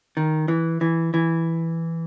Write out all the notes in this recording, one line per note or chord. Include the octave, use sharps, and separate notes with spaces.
D#3
E3
E3
E3